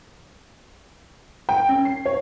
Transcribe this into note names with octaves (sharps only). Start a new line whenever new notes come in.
G5
C#4
C7
C#5